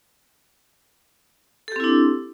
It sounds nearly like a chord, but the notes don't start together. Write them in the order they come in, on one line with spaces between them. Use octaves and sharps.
A4 G4 C4 E4 D4